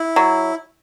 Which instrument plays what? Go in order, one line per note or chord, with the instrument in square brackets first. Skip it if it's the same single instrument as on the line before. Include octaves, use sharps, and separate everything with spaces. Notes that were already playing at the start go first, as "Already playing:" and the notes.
Already playing: [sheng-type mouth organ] E4
[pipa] F#3